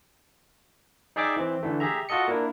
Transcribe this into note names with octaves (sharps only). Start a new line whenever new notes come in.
D#4 G#4 D5 E5 G5 D6
E3 C4
D3 E3 A3
G4 G#4 E5 A#5
F4 F#4 A4 D#5 C#7
A#3 D4 E4 A#4